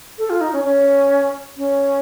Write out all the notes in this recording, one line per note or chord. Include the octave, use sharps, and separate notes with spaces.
A4
F4
D#4
C#4
C#4
C#4